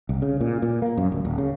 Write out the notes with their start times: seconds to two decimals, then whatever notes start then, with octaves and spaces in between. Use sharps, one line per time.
0.09 C2
0.22 C#3
0.41 A#2
0.62 A#2
0.82 A#3
0.98 F#2
1.12 D1
1.25 D#1
1.38 C#3